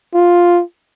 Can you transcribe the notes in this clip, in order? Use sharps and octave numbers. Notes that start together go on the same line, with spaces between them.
F4